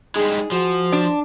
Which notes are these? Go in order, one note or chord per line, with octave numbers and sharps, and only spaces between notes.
G3 G#3 D#4 G#4
F3 F#4
D4